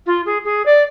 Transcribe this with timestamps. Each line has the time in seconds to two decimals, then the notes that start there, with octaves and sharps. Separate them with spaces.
0.06 F4
0.26 G#4
0.45 G#4
0.65 D5